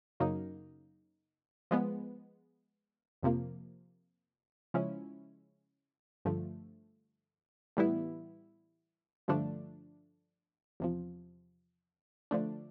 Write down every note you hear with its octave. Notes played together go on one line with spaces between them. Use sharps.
F#2 C#3 F#3 A#3 D#4
F3 G#3 B3
F2 C3 F3 A#3
C#3 F3 G#3 C#4 E4
G2 D3 F3 A3
A2 E3 G3 B3 E4
G2 D3 F3 A3 D4
E2 C3 F3
D3 F3 A3 D4